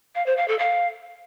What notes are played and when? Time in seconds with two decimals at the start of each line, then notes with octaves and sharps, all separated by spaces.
0.15 F5
0.26 C5
0.37 F5
0.48 A4
0.59 F5